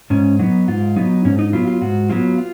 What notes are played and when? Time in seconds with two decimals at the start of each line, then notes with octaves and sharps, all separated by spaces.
0.10 G#2 C#4
0.39 F#3 B3 D#4
0.68 G#2 F4
0.96 F#3 B3 D#4
1.25 G#2 C#4
1.39 D#4
1.53 F#3 B3 F4
1.68 F4
1.81 G#2 F#4
2.10 F#3 B3 F4
2.38 F4